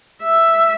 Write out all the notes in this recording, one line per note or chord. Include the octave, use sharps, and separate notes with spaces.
E5